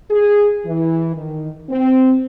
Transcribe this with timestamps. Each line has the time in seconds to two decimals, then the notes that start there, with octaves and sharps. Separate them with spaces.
0.11 G#4
0.65 E3
1.15 D#3
1.70 C4